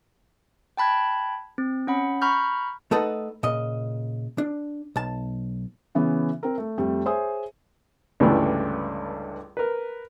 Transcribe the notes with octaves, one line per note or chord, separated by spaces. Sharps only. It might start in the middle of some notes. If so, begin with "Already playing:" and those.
G5 A5 B5 F#6 G#6
C4
C#4 F#5 B5
A#5 B5 C#6 F6 G6
A3 D#4 A4 B4 D#5 F#5
A#2 C#3 D#5
D4
B1 A5
C#3 E3 B3 C#4
C4 A#4
A3
F2 G3 A3
G#4 C5 C#5 E5 G#5 D#6
C#2 G2 D3 E3 G3 A3
A#4 B4